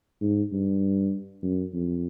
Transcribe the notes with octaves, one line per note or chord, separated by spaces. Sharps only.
G#2
G2
F#2
F2